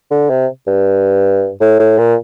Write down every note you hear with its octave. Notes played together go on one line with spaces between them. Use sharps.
D3
C3
G2
A2
A2
A#2